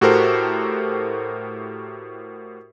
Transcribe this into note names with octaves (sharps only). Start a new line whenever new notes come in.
A2 F#4 G4 A4 A#4 C5